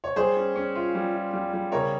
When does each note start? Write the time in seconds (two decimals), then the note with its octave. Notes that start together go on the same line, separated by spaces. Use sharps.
0.04 C#5
0.16 G3 G#4 C5
0.36 C#4
0.56 C#4
0.75 F4
0.95 G3
1.14 F4
1.34 G3
1.53 G3
1.72 C#3 A#4 C#5